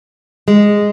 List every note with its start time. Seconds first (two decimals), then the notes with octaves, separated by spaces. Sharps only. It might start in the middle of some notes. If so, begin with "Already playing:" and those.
0.48 G#3